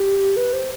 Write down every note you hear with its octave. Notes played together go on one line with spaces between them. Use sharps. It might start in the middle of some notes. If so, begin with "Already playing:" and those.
Already playing: G4
B4
C5